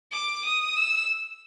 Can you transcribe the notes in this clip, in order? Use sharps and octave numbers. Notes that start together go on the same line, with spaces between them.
D6
D#6
E6